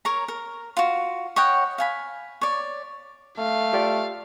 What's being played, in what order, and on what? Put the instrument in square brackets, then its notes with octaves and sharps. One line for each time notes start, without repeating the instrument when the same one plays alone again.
[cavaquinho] A#4 C#5 A#5
A#4
F4 F#4
C#5 D#5 F#5 G5
F5 G#5 B5
C#5 D5
[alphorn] A3 [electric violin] F5
[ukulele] F4 G4 D5